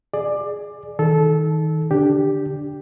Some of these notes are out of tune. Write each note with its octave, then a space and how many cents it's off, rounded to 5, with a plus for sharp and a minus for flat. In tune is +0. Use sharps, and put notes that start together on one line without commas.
G#4 +5 D5 +20
D#3 +25 A4 -20
D3 +0 D4 +0 G4 +0